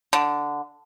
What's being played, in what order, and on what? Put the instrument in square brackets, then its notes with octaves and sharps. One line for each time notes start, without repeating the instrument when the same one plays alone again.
[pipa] D3